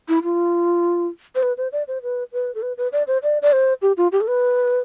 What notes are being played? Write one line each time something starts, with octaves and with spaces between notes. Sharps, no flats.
E4
F4
C5
B4
C5
D5
C5
B4
B4
A4
B4
B4
D5
C5
D5
D5
C5
G4
F4
G4
A4
B4